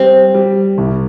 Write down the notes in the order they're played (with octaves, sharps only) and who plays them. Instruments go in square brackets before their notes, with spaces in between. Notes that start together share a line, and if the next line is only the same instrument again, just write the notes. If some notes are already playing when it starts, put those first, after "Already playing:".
Already playing: [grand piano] G3 [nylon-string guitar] C4
[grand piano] G3
C2